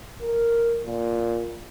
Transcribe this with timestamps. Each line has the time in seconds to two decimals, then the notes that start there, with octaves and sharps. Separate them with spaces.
0.22 A#4
0.86 A#2